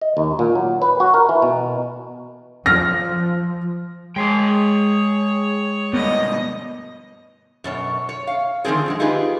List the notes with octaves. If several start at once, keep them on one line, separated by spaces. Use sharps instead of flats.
D#5
D#2
A#2
F#3
B4
F#4
A#4
E3
B2
F3 F6 A#6
G#3 G#4 C#5 G5 C6
G2 B2 B3 D#5
F#2 B2 C#5
C#5
F5
D3 D#3 F3 A#3 C4 G#4
F#2 F#3 G#3
D#4 F4 G4 G#4 B4